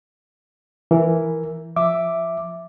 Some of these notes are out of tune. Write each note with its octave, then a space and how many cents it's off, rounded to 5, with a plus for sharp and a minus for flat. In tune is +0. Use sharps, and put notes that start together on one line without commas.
E3 +5 A#4 +0
F3 +0 E5 +0 D6 +0